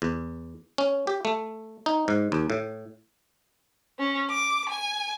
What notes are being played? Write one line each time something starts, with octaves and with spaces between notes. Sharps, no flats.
E2
C#4
G4
A3
D#4
G#2
D#2
A2
C#4
D6
G#5